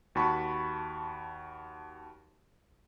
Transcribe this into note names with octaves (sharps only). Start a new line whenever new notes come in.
D#2 F#4 A5 B5 C#6